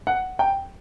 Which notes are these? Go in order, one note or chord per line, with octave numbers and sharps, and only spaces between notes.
F#5
G5